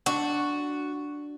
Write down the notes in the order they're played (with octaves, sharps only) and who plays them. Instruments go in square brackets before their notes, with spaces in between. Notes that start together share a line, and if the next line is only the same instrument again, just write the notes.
[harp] D4 [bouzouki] F#4